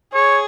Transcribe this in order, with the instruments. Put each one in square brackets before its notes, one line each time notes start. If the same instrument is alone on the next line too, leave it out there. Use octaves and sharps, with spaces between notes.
[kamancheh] G#4 [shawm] C#5